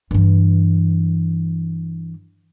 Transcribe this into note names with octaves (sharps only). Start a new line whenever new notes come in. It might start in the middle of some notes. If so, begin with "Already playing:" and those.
G2 E3